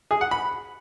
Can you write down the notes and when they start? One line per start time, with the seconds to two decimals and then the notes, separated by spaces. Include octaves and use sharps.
0.11 G#4
0.21 F#5
0.31 B5